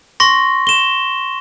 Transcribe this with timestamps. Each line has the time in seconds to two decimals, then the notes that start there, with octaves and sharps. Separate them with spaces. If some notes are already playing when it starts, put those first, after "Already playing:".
0.20 C6 C#6 A#6
0.67 E7 G7